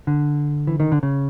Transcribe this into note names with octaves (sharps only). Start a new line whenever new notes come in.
D3
E3
D#3
D3
C#3